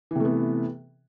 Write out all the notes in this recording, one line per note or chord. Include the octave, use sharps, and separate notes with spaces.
C3 E3 A3 B3